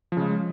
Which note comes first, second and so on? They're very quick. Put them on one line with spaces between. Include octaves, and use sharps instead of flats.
F3 C#3 G#3